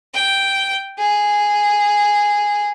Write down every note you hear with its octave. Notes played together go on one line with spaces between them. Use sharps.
G5
G#4